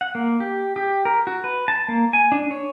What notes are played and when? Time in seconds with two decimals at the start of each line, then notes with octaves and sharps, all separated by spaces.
0.01 F#5
0.15 A#3
0.40 G4
0.76 G4
1.05 A#4
1.27 F#4
1.44 B4
1.68 A5
1.88 A#3
2.13 G#5
2.32 D4
2.51 C#5